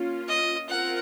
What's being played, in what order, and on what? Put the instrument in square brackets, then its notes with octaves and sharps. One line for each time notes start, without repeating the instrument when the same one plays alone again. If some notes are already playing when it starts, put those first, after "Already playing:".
Already playing: [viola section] A#3 C#4 F4
[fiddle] D#5
[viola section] C4 F4 A#4 [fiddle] F#5